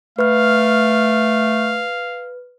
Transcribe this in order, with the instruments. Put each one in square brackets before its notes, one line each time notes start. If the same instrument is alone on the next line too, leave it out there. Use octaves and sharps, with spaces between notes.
[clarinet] A3 [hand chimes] B4 F6 [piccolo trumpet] F5